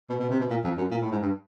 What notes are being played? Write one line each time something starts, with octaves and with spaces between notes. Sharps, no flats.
B2
B2
C3
B2
A#2
F2
F#2
A#2
A2
G#2
G2